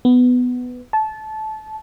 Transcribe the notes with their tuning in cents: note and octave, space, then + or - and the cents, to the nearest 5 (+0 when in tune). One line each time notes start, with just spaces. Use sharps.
B3 +10
A5 -20